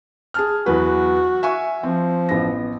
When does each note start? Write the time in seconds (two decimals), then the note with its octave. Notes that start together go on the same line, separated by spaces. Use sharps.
0.34 G#4 A5 F6
0.66 E2 F#3 F#4 B4
1.43 E5 G#5 C#6
1.83 F3 C4
2.29 A1 B3 A#6